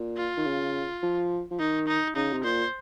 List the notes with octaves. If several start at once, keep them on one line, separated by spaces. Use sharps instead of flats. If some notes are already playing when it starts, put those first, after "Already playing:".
Already playing: A#2
F4
D#3
C#3
F3
F3
D#3 D#4
D#4
C#3 D#4
C3
A#2 C5